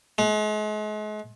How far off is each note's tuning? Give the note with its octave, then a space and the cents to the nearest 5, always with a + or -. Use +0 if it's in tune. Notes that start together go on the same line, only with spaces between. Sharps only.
G#3 +40